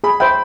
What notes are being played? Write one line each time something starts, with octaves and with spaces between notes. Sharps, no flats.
G#4 B5
C5 E5 G5 B5